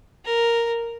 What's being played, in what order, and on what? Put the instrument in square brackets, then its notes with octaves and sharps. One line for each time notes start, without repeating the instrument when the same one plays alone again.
[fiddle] A#4